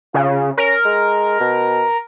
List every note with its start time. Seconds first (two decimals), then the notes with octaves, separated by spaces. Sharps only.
0.14 C#3 F4
0.58 C#4 A#4
0.85 G#3
1.40 B2